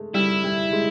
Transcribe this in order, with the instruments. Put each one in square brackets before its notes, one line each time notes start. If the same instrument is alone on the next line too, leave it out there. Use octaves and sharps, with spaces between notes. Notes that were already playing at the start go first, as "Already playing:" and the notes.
Already playing: [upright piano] G#3 A3
[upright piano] G3 [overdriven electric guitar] E4
[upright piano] G3
G#3